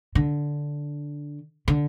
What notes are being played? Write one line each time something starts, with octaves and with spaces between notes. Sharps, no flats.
D3
D3